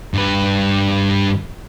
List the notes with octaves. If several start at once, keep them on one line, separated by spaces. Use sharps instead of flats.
G2 B4